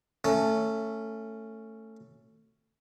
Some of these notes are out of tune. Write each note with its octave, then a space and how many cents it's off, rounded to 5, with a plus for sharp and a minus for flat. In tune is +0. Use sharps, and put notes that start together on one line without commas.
A3 +15 C#4 +0